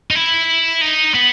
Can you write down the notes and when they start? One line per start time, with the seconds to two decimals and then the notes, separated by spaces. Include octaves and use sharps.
0.11 D#4
0.15 E4
0.81 D#4
1.14 B3